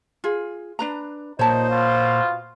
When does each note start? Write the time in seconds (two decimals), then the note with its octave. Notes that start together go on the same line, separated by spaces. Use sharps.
0.24 F4 G#4
0.79 D4 B4 A#5
1.39 A#2 D#4 C5 C#5 A5
1.70 B2 F4